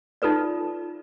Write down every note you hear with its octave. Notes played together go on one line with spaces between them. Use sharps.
D#4 F4 A4 B4 D5